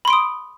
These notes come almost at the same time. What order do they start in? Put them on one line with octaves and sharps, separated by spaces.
B5 C6 D7 D#6